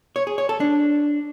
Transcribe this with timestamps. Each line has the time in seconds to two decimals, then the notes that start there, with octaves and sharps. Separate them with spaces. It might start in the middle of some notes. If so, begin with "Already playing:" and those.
0.16 C#5
0.27 G#4
0.38 C#5
0.49 A4
0.60 D4